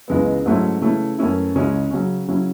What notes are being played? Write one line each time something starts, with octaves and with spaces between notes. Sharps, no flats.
C#2 C#3 E3 G#3 B3
G#2 F#3 A3 C#4 E4
C#3 E3 A3 C#4 E4
F#2 E3 A3 C#4 E4
C#2 C#3 G#3 C#4 E4
C#3 F#3 C#4
C#3 F#3 C#4 E4